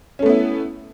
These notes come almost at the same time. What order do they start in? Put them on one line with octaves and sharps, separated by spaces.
C#4 A3 B3 E4